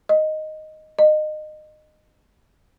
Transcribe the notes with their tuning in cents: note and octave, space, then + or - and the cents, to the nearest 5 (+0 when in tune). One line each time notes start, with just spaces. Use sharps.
D#5 +0
D#5 -25